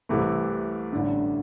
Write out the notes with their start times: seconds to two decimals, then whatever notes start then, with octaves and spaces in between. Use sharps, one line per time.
0.09 C2 C3 E3 A3
0.93 A1 G2 D3